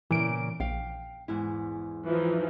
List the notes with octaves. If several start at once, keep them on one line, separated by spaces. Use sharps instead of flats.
A#2 C#3 E3 D7
A#1 F5 G5
E2 G#2 E4
E3 F3 D#4